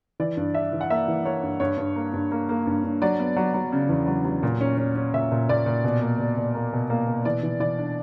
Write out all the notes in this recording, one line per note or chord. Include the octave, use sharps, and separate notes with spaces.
E3 D5
G2
D4 E5
E3
F#5
A#3 E5
E3
A#3 C#5
G2
G2 C#5
G2
A#3
G2
A#3
A#3
G2
G2
F#3 D5
B3
F#3
F#3
C#3
E2
F#3
F#3
A#2
C#4
C#4
C#4
A#2 E5
A#2
A#2 D5
A#2
B2
A#3
B2
B2
A#3
B2
A#3
B2
E3 D5
E3
E3 D5
D4